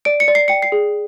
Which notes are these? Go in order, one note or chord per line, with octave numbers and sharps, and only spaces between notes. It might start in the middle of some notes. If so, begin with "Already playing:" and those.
D5 D7
C#7
D5
C7
G5 C#7
C7
G#4